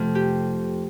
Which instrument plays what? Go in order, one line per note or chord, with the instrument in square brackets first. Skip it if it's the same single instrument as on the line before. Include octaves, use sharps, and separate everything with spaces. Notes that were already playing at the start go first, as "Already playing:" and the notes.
Already playing: [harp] F2 C3 A3
G4